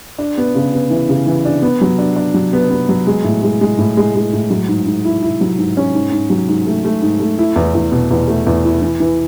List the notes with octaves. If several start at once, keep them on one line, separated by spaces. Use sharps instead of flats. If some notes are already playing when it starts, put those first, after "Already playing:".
D4
B3
C#3
B3
E3
C#3
E3
D4
B3
F#3
D4
D4
F#3
B3
B3
F#3
G#3
A2
G#3
G#3
A2
G#3
G#3
A2
F#3
G#2
G#2
E4
E4
F#3
G#2
C#4
G#2
G#2
F#3
G#2
A3
A3
G#2
A3
E4
E2
E2
B2
E2
A3
E2
E4
E3
E3